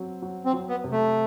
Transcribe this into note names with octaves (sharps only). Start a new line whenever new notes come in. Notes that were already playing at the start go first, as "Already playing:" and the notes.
Already playing: F#3 C4
F#3
C4
F#3
B3
C3
A3